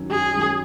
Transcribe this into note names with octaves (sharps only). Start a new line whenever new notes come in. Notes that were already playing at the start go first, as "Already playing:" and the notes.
Already playing: F#2 D#3 F#3 C#4
F#2 G#4
D#3 F#3 C#4